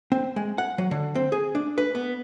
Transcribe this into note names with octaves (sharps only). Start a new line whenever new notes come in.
C4
G#3
F#5
F#3
D3
C4
G#4
D4
B4
B3